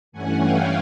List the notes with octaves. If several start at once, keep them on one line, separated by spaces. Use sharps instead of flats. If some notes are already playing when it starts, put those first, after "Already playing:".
G2 E3 A3 C#4 F#5 G#5
F5 G5